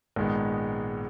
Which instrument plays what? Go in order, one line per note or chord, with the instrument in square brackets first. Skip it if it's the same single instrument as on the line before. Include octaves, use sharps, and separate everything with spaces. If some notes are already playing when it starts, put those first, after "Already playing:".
[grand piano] A#1 G#2 D#3 G#3 B3